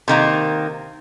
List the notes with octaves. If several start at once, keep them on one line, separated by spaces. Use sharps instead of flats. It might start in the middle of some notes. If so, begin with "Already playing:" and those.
C3 D#3 A#3